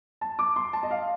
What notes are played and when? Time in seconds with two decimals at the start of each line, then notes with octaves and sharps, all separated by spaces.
0.21 A5
0.39 D6
0.56 C6
0.73 A5
0.83 D#5
0.91 F5